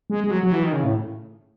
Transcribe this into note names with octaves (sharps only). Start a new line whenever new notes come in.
G#3
G#3
F#3
F#3
E3
D#3
C#3
A2